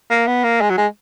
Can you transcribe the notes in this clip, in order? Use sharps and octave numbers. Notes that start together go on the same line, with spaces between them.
A#3
B3
A#3
G#3
F#3
G#3